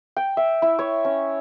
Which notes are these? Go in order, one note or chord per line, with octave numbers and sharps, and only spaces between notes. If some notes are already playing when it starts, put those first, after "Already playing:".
G5
E5
E4
C#5
C#4